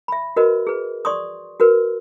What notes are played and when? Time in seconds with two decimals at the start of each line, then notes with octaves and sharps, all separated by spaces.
0.08 E5 B5
0.36 F#4 A#4 B4 D#5
0.67 G#4 B4
1.05 D5 C6 C#6 D#6
1.60 F#4 A#4 B4